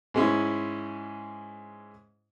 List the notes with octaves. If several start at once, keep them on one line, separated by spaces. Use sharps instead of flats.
G#2 G#3 C#4 E4